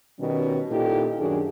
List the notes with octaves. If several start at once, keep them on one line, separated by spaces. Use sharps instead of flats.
B2 D#3 G3 C#4
A#2 D#4 E4 G4 A4
F#2 D#3 D4 F#4 G#4